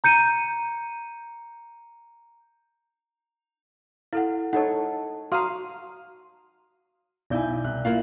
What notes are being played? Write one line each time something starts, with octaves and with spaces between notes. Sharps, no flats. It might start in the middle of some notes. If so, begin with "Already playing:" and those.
A#5 G6 C#7 D#7
E4 A4 F5 F#5
D#4 A4 C#5 F#5 A5
F#4 F5 A#5 C6 D#6
B1 B2 E4 D5 G#5 G6
C2 F#6
A#3 E4 F4